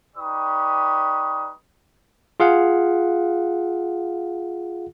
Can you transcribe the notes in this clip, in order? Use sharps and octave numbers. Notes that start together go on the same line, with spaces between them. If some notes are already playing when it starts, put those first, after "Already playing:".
D#4 G4 B4 D5 C#6 D#6
F4 G#4 F5 F#5